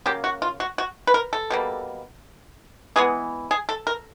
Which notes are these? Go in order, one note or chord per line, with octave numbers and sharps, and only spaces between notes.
C#3 F#3 A#3 G4
F#4
F4
F#4
F#4
B4
A#4
A4
B2 G3 A#3
E3 G#3 B3 G#4
G#4
A4
A#4